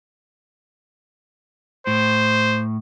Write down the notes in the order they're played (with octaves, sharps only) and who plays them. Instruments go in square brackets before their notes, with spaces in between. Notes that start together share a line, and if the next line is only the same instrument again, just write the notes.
[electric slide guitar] A2 [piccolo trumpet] C5